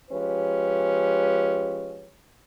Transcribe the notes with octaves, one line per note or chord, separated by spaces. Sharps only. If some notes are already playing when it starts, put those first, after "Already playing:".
F3 G#3 C#4 G4 B4